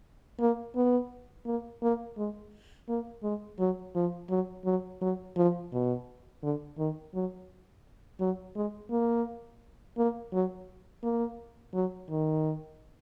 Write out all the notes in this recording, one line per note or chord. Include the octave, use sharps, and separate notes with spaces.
A#3
B3
A#3
A#3
G#3
A#3
G#3
F#3
F3
F#3
F#3
F#3
F3
B2
D3
D#3
F#3
F#3
G#3
A#3
A#3
F#3
A#3
F#3
D#3